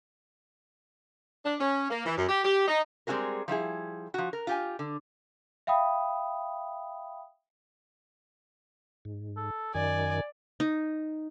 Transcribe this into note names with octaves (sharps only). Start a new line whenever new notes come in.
D4
C#4
A#3
E3
F#2
G4
G4
D#4
G3 G#3 C4 F#4 G#4 A#4
F3 G3 E4 G#4
F3 F#4
A#4
F4 G4 G#5
D3
E5 F5 G5 B5 D#6
G#2
A4
F#2 D#3 D5 G#5
D#4